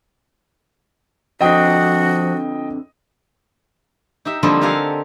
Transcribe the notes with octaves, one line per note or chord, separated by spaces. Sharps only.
F2 D3 F3 F#4 D#5 G5 D#6
D#4 G4 E5
D3 F3 G3 A#3 C4 D#4
G4 A4 A#4 F5 F#5 G#5